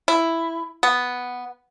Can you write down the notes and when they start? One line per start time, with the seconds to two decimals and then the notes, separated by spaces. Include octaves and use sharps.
0.08 E4
0.83 B3